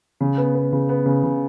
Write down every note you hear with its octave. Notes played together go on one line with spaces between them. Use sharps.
C#3
B3
B3
C#3
B3
C#3
C#3